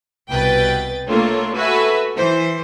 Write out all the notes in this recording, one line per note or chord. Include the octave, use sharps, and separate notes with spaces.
C2 B2 B4 G5 A6
A3 A#3 D4 F4 C#5
F#4 A4 B4 E5 G#5
E3 C5